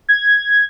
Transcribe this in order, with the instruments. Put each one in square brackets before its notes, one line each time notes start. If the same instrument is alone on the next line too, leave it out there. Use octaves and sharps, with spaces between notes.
[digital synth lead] G#6